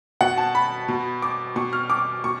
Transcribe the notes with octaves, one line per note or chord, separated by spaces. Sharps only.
B2 F#5
A5
B5
B2
D6
B2 C#6
F6
D6
B2 C#6